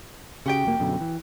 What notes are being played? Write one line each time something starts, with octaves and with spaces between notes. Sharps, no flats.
C#3 F#4 G4 G5
F1 A#3
F#2 B2 D3
E3